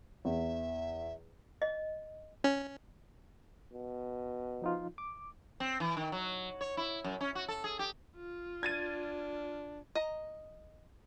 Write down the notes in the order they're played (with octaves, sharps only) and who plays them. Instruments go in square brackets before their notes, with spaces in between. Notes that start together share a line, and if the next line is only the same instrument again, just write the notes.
[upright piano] E2 [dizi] E5
[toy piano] D#5
[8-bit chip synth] C#4
[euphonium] B2
[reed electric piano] F3 D#4 F4
D6
[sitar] C4
E3
D#3
F#3
C#5
E4
F#2
C#4
F#4
A4
G#4
G4
[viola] F4
[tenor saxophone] D4 [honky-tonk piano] G#6 A6 D#7
[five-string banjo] D#5 A#5